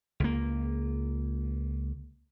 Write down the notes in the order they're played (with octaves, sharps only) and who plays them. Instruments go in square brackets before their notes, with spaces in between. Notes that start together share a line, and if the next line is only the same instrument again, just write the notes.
[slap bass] C#2 A#3